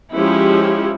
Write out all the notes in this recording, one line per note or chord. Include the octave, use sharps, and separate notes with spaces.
F3 G#3 C#4 E4 G4